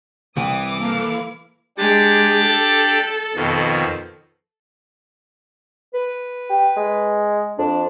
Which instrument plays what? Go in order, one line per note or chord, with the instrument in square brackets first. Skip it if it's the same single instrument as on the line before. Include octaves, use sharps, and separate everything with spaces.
[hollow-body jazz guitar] C2 [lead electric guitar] E3 [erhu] D6 [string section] D#6
[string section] A#3 A4 F5
[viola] G#3 [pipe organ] D4 G4 A6
[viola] A4
[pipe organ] F2 B2 D#3
[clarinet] B4
[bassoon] G4
G#3
[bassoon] F2 [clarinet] D4